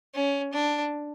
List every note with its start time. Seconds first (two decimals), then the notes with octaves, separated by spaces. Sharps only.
0.14 C#4
0.53 D4